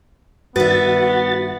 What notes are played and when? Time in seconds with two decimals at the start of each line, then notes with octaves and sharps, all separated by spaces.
0.56 G2 D#3 B3 F#4 B4 E5 A6